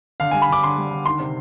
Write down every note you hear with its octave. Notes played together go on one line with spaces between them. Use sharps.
D3 F5
G3 G#5
B5
D3 D6
D3 C6
G3
D3
D#3 C6
C3